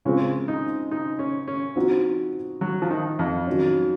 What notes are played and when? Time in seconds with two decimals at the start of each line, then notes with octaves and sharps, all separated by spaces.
0.05 C#3 F3 G#3 C4 C#4 F4
0.48 D#4
0.91 D#4
1.19 C#4
1.48 C#4
1.76 F3 C4 D#4 F#4
2.61 F#3
2.82 F3
2.91 D#3
3.19 F2
3.47 D#3 F#3 C#4